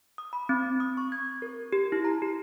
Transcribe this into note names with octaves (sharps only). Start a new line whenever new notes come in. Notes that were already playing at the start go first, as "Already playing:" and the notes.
D#6
B5
C4
D#6
C#6
G#6
A#4
G4
E4
A#5
G4